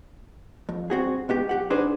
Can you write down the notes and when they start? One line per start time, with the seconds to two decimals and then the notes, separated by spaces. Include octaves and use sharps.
0.69 F2
0.90 G2 C4 F#4 G#4
1.29 G#2 B3 G4
1.49 B1 G4 F#5
1.70 D4 D#4 G#4 B4 C5